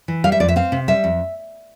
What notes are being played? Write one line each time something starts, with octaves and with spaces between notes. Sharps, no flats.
E3
G3 F5
E5
F2 D5
E5
C4 F5
C3
G3 E5
F2